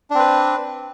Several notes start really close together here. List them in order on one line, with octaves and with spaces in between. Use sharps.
D4 C4 B4